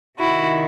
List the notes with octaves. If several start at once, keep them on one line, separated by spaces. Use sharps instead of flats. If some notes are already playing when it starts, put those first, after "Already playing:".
C3 D#3 E4 F#4